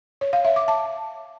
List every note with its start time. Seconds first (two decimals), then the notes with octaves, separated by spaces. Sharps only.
0.21 C#5
0.33 F5
0.45 E5
0.56 D6
0.68 A5